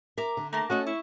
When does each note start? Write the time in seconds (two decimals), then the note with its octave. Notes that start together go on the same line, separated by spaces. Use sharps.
0.18 A#4 E5 A#5 D6
0.37 D3
0.53 A3 A#3 A#4 A5
0.70 A3 C#4 F#4 A4 D#5 A5
0.87 E4 C#6